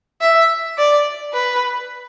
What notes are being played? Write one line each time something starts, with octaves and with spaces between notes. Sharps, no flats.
E5
D5
B4